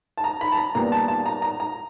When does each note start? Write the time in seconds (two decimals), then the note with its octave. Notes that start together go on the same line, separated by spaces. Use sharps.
0.18 A5
0.24 A#5
0.41 B5
0.52 A5
0.57 A#5
0.75 A#2 G3 B3 A#5
0.92 A5
1.08 A5
1.26 A#5
1.42 A#5
1.60 A#5